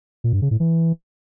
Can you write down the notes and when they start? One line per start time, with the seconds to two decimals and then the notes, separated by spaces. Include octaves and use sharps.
0.24 A#2
0.33 G2
0.42 C#3
0.51 A2
0.60 E3